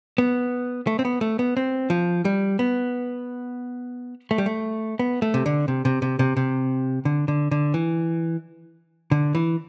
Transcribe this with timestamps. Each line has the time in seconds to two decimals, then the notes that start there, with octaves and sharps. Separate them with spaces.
0.18 B3
0.87 A3
0.99 C4
1.05 B3
1.21 A3
1.39 B3
1.57 C4
1.90 F3
2.25 G3
2.59 B3
4.31 A3
4.38 G3
4.46 A3
4.99 B3
5.22 A3
5.34 C3
5.46 D3
5.68 C3
5.85 C3
6.02 C3
6.19 C3
6.37 C3
7.05 D3
7.28 D3
7.51 D3
7.74 E3
9.11 D3
9.35 E3